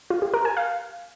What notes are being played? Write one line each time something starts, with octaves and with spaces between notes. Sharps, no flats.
F4
G4
A#4
G#5
F5